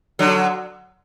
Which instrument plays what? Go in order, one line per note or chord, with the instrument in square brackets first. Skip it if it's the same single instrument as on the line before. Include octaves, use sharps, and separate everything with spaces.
[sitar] D3 F#3